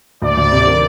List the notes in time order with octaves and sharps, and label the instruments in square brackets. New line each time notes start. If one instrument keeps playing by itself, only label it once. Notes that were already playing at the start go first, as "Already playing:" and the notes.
[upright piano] D2 [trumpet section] D5
[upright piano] D2
C3
D#3